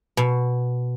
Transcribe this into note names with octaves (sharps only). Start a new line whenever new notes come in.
B2